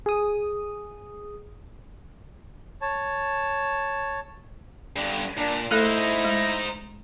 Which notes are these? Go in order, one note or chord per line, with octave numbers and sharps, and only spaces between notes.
G#4 D#6
C#5 A5
G2 D3
A#2 D4
A3 D#4 E4 A4 C5
G#3